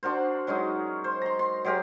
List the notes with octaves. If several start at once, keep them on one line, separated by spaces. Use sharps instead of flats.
D4 F#4 A#4 C5
F#3 G#3 C#4 D#4
C5
A#5 C6
C6
F#3 G#3 G4 A#4